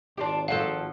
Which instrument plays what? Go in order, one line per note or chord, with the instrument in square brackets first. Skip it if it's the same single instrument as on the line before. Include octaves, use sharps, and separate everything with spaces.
[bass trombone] G#1 [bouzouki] D4 F4 G4
[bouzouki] F3 F#3 [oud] F#4 A4 [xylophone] F5